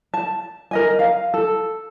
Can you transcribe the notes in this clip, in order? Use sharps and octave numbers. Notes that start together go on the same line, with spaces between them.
A5
A#4 D#5 G#5
F5 A#5
A4